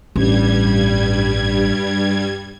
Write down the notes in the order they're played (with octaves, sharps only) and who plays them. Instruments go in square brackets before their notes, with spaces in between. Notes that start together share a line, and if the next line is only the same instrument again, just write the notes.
[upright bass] A1 [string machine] G2 G3 G#6